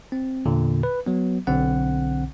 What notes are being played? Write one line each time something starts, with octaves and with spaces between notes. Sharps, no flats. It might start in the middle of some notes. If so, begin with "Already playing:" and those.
C4
E2 A#2 D3
B4
F#3 B3
B1 D3 C4 F#5